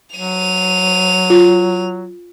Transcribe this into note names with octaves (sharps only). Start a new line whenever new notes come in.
F#3 D#7 F7
F4